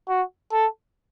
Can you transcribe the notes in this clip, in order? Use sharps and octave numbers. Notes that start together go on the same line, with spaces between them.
F#4
A4